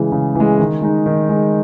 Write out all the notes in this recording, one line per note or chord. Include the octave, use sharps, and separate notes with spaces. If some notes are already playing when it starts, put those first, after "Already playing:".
Already playing: C#3 E3 G#3
C#3
E3 G#3
D#3
G#3 D#4
D#3
G#3 D#4